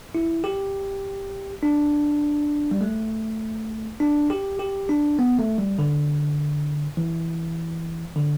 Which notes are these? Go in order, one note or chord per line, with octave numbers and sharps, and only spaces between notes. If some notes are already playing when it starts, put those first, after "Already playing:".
E4
G4
D4
G3
A3
D4
G4
G4
D4
B3
A3
G3
D3
E3
D3